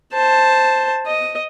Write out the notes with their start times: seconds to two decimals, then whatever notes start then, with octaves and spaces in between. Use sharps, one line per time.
0.13 C5 A5
1.06 D#5